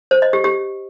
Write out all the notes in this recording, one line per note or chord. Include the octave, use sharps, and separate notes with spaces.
C5
D#5
G4
G4